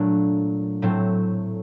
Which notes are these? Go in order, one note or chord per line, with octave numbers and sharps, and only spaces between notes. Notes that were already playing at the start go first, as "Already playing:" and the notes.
Already playing: A#2 F#3 A3 D4
A2 F#3 A3 C4